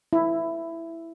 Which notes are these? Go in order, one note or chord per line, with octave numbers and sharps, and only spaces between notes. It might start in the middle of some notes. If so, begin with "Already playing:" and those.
E4